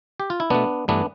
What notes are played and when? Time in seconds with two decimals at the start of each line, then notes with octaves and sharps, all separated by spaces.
0.20 G4
0.30 F4
0.40 E4
0.50 B2 A3 B3 D4
0.88 G2 E3 A3 B3 D4